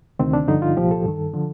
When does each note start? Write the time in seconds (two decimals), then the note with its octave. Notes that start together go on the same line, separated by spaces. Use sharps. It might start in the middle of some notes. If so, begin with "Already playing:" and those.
0.19 D2 C3 D#3 C4
0.33 D4
0.48 G2 D3 F3 D#4
0.62 F4
0.76 C2 A#2 F3 G4
0.91 A4
1.04 G2 D#3
1.34 D3 F3